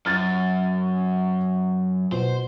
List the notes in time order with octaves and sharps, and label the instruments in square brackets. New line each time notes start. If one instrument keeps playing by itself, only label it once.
[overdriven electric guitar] F#2 [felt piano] F6 A6
[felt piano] B2 [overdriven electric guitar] C5